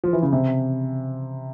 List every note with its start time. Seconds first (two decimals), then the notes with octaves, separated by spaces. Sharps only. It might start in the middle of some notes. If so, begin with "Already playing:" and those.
0.04 F3
0.13 E3
0.22 C#3
0.33 C3